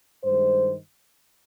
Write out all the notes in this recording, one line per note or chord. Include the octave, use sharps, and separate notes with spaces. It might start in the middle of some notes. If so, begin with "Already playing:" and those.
G2 D#3 G#3 C5